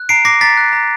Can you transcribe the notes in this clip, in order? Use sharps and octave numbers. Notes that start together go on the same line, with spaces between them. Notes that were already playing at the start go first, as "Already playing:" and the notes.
Already playing: F#6
A#5 C7 D7
D6 A#6 C7
A#5 A6 B6
F#6
A#5